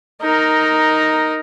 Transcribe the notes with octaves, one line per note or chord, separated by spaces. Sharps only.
D#4 A#4